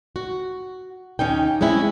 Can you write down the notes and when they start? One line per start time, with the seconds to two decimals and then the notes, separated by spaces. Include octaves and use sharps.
0.16 F#4
1.19 D#2 C#4 D#4 G5
1.61 G#3 C4 C#4 E4